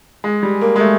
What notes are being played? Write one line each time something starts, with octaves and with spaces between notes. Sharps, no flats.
G#3
G3
A#3
G#3
A3